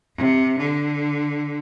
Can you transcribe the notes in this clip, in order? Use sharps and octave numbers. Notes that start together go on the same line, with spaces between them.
C3
D3